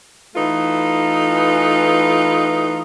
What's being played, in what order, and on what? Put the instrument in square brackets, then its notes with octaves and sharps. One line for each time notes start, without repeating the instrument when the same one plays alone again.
[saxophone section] E3 A3 D#4 F4 B4